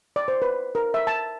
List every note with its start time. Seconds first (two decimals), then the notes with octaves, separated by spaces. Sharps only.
0.16 D5
0.28 C5
0.42 B4
0.75 A#4
0.94 E5
1.07 A5